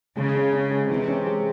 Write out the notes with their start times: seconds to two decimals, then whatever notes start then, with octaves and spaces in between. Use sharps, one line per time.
0.16 C#3 G#3
0.35 C#4
0.53 C#4
0.71 G#3
0.90 C3 E3
1.08 C#4
1.27 G#3